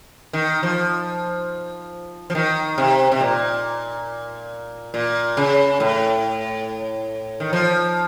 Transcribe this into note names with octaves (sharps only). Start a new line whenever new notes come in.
D#3
F3
F3
D#3
C3
C3
A#2
A#2
C#3
A2
D#3
F3